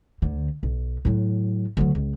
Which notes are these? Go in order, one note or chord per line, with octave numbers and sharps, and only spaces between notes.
D2 D3
B1
A2 F#3
D2 F#3
C#2